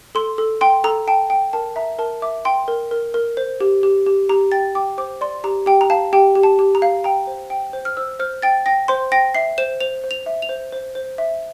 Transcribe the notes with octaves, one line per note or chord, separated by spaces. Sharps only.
A4 C6
A4
G5 C6
A4 A#5
G5 A5
G5
A#4 A5
E5 A#5
A#4 A5
E5 D6
G5 C6
A#4
A#4
A#4
C5
G4
G4
G4
G4 A#5
G5 A6
G5 D6
C5 D6
D5 C6
G4 A#5
G4 G5
A#5
F5 A5
G4 G5
G4
A5
G4
A#5
F5
G5 A#5
C5
G5
C5
F6
C5 E6
C5 F6
G5 A6
G5 A#6
C5 C6
G5 A#6
E5 C7
C5 E7
C5 F7
C5
F7
E5
F7
C5
C5
C5
E5